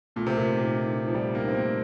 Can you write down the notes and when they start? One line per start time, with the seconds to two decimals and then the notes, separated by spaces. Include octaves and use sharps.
0.16 A#2 A3
0.27 C3
0.35 A#2 A#4
0.55 A#2 D#4
0.75 D#4
0.95 D#4
1.08 F3
1.14 G3 D5
1.35 A#3 D#4
1.48 C4
1.54 A3 A#3